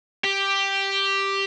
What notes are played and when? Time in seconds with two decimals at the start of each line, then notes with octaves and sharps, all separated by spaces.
0.24 G4